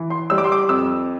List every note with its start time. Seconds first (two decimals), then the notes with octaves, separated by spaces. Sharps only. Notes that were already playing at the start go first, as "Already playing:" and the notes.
Already playing: E3
0.10 C6
0.30 G3 E6
0.38 D6
0.44 C6
0.52 D6
0.69 F2 E6